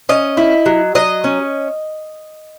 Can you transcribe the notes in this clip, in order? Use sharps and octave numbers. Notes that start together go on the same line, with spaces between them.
C#4 D#5
E4
F#3
F#3 D#5
C#4